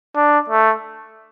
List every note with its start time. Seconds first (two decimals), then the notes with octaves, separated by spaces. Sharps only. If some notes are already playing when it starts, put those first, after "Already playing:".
0.15 D4
0.49 A3